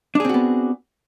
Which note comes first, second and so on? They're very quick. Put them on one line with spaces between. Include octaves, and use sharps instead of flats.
D4 G#4 C4 F#4 B3